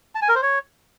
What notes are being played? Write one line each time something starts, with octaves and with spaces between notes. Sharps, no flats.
A5
G#5
A#4
C5
C#5